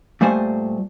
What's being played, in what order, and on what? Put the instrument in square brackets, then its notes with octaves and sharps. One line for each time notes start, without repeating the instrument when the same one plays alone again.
[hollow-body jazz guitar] A#2 G3 A3 C5 G#5